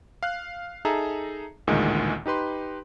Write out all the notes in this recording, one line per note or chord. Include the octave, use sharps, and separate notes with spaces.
F5 F#6
D#4 G#4 A4 E5 A#5
A1 D2 A#2 D#3 G#3
D#4 G4 B4 C6